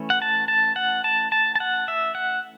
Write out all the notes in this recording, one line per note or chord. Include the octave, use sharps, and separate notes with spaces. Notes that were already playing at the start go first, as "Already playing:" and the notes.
Already playing: E3 A3 C#4
F#5
A5
A5
F#5
A5
A5
A5
F#5
E5
F#5